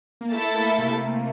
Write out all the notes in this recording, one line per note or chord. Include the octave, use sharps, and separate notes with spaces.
A#3
A3 E4 A4 E5 A5
A3
A#3
C3